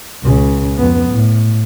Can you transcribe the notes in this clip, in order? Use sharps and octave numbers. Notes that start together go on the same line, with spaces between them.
C#2 C#3
F2 B3
A2